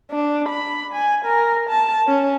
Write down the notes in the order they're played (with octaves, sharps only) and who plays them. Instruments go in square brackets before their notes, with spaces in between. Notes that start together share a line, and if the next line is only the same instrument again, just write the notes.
[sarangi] D4
B5
G#5
A#4
A5
C#4